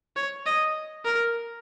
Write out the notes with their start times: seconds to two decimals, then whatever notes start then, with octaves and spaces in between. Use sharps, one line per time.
0.16 C#5
0.46 D#5
1.05 A#4